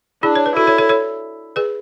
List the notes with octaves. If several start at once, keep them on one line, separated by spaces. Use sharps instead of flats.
D4 E4 G#4
C#5
B4
E4 F#4 A4
A4 C#5
A4 C#5
A4 C#5
G#4 B4